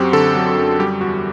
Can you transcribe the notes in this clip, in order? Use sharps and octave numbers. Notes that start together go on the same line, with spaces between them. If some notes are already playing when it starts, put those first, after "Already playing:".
Already playing: F#2 F#3 C4 F#4 G4
D3 A4
F#3
F#2
G3 G4
E2 F#4